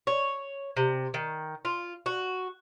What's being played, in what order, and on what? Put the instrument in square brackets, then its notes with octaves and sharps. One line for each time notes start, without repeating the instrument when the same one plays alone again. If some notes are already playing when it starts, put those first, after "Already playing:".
[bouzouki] C#5
C3
D#3
F4
F#4